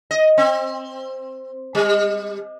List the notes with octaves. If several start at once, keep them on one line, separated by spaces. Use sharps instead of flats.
D#5
C4
G3